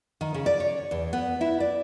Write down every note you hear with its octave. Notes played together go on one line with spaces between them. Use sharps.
D#3
C#3
D5
C#5
E2
B3
E4
D5